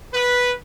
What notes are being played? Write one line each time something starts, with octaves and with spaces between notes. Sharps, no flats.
B4